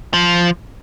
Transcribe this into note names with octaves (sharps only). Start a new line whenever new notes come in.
F3